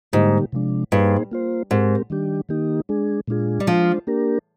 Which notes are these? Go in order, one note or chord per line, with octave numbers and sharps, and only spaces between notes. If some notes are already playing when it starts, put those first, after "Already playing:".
G#2 D3 G3 A#3 D#4 G4
C3 F3 G#3 D4
G2 A#3 D#4 G#4 C5
A#3 F4 C5
G#2 G#3 C4 G4 A#4
D#3 G3 D4 G4
D#3 A#3 D#4 G4
G#3 D4 G#4
A#2 G#3 D4 F4 G#4
G3
F3 G#3 D4 F4 C5
A#3 D4 G4 A#4